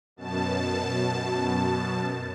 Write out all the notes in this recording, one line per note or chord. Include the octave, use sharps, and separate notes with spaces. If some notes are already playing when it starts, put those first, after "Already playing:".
F#2 B2 A5